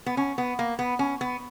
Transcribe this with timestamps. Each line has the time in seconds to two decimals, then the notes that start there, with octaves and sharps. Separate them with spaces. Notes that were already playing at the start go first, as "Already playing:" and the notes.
0.06 B3
0.17 C#4
0.38 B3
0.59 A#3
0.79 B3
0.99 C#4
1.21 B3